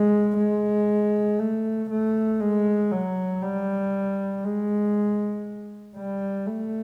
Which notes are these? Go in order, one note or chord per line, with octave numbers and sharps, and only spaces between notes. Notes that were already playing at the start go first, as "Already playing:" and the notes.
Already playing: G#3
G#3
A3
A3
G#3
F#3
G3
G#3
G3
A3